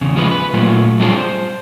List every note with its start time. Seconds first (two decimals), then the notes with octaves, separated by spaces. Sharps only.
0.01 E2 C#3
0.16 C#3 F3 G#3 B3 F4 B4
0.31 B4
0.53 A#2 F#3 A3 F4
1.00 F#3 G3 C4 D4 F4 G#4
1.16 C5